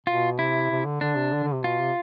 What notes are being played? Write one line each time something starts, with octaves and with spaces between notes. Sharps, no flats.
B2 F4
C3 E4
C3
D3
D3 D4
C3
D3
D3
C3
B2 F4
C3